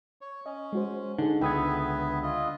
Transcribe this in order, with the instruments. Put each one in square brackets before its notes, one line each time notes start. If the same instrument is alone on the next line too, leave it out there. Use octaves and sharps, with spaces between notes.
[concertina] C#5
[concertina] C#4 [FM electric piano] D#5
[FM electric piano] G#3 F#4 C5
[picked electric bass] D3 [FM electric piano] D#4 G#4
[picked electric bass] C#2 D3 [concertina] B3 B4 E5 [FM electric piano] G5 D#6 G#6
[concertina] F4 D#5